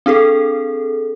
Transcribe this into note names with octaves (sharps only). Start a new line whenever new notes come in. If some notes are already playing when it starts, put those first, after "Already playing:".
C4 D4 G#4 A4